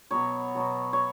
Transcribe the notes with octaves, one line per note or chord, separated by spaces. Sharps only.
B2 F#3 B3 C#5
B2 F#3 B3
C#5